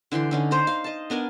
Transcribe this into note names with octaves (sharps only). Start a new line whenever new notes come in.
D3 E3 G5 C6
D3 C#4 D#4
C5 D#5 A#5
F5
D#5 A5
B3 D4 A#4 G#5